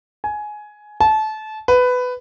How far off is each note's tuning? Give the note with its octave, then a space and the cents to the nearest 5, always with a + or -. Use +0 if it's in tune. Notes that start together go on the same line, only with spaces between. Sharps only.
G#5 +15
A5 -25
B4 +15